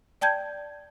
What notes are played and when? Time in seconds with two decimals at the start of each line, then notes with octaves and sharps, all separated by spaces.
0.21 D5 G5 A5 G6 G#6